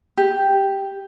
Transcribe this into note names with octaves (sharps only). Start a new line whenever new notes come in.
G4